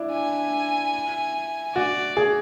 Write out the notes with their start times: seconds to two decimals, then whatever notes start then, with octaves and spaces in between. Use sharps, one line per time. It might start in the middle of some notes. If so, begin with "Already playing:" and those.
Already playing: D4 E4
0.13 G#5
1.75 F#4 D5
2.17 G#4